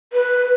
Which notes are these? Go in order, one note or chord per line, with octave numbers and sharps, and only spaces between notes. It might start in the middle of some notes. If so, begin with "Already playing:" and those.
B4